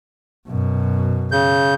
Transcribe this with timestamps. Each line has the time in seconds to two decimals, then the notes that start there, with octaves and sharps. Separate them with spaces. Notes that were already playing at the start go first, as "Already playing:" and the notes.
0.49 F#2 B2
1.32 C#3 G6